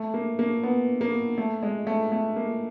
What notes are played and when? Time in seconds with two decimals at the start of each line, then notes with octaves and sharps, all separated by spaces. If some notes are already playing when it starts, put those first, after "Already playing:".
Already playing: A3
0.14 A#3
0.39 A#3
0.63 B3
1.01 A#3
1.38 A3
1.63 G#3
1.87 A3
2.12 A3
2.36 A#3